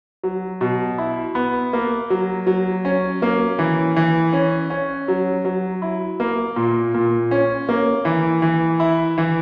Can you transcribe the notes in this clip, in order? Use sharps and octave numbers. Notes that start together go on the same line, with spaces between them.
F#3
B2
E4
B3
A#3
F#3
F#3
C#4
A#3
E3
E3
C#4
C#4
F#3
F#3
E4
A#3
A#2
A#2
C#4
A#3
E3
E3
E4
E3